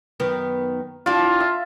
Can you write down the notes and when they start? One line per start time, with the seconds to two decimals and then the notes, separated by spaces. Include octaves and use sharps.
0.20 F#2 D#3 B3
1.06 D4 E4 F4 G4
1.40 E5